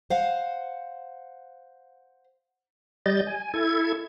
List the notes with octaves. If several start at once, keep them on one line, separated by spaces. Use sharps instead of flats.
C5 F5 F#5
G3 D#5 G6 A6
G#5
E4 A4 G#6